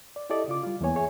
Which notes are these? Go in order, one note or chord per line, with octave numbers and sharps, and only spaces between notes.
D5
E4 G4 A4 D5 D#5
C#3 F4 D6
G3 F4
E2 E3 A#3 B3 C#5 G#5
G#4 C#5 E5 G#5